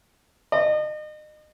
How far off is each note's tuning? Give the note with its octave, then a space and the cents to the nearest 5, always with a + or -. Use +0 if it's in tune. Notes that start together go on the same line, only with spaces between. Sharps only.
D#5 -35